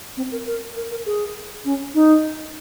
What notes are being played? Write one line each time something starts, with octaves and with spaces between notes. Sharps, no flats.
C4
A#4
A#4
A#4
A#4
G#4
C#4
D#4